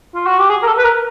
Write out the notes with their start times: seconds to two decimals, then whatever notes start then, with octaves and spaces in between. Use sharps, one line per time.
0.15 F4
0.26 F#4
0.38 G4
0.50 G#4
0.63 A#4
0.67 A4
0.78 B4
0.84 A#4